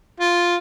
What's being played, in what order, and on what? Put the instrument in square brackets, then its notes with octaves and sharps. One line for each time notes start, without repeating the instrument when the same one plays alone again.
[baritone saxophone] F4